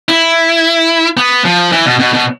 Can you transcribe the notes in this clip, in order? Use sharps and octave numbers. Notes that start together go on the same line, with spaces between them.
E4
B3
F3
E3
B2
B2
B2